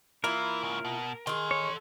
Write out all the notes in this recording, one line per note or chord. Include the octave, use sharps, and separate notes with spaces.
E3 A#3 E4 F4 A#4
G#2 C#3
B2
D#3 G#4 A4 C6
C#5